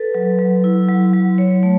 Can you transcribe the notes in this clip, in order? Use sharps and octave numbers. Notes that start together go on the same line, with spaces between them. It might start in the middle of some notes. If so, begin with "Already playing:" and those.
Already playing: A4 B4
F#3
F#3
E4
F#3
F#3
C#5
A3